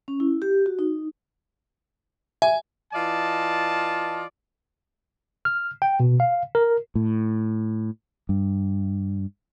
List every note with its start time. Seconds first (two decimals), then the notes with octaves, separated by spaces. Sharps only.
0.08 C#4
0.20 E4
0.42 G4
0.66 F#4
0.79 D#4
2.42 E5 G#5
2.93 E3 F4 D5 D#5 A5
5.45 F6
5.82 G5
6.00 B2
6.20 F5
6.55 A#4
6.95 A2
8.29 G2